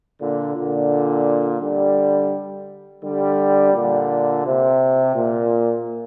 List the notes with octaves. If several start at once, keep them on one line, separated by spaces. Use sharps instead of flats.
A#2 D3
A#2 D3
D3 G3
D3 G3
A#2 D3
C3
A#2